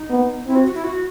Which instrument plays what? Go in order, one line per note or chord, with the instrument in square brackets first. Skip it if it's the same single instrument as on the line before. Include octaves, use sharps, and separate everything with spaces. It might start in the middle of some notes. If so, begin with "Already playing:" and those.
Already playing: [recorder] D#4
[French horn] B3
[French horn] C4 [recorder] E4
[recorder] F#4
F#4
E4
F#4